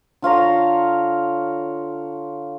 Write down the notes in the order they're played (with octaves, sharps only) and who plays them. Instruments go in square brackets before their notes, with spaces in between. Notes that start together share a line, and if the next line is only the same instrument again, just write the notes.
[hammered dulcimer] D3 F4 C#5 A#5